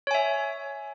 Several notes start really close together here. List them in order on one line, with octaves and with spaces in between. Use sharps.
C#5 G#5 E5